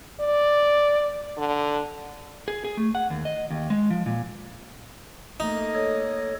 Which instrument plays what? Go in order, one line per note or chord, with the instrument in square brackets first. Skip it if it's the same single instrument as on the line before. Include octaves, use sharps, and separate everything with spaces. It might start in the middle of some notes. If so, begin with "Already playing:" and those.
[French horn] D5
D3
[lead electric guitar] G#4
G#4
A3
F#5
D#2
D#5
D#2
G#3
F3
A#2
[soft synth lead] A3 [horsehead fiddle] A#3 D#5 [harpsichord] D#4
[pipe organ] A4 C#5